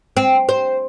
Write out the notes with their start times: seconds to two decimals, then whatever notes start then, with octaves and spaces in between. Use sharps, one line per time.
0.17 C4
0.49 C5